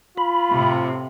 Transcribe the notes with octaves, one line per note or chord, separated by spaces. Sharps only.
F4 B5
A2 C3